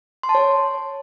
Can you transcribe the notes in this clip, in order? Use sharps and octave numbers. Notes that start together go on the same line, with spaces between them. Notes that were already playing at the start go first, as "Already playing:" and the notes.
C6
A5
C#5